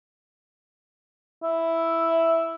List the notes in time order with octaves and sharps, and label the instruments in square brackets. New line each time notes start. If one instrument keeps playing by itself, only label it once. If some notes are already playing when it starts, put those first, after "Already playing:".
[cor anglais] E4